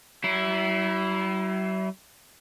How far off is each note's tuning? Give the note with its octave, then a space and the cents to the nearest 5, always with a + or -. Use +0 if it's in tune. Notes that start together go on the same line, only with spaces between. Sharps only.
F#3 +45 E4 +0